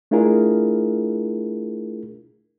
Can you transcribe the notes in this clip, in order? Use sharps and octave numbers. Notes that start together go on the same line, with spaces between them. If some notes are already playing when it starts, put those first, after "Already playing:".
A3 D4 E4 F4 G#4 A#4